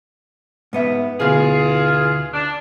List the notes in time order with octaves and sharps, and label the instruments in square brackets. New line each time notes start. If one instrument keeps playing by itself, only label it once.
[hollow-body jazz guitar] G#2 B3 E5
[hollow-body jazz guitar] D2 B2 [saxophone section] E3 F4 G#4
[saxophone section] D4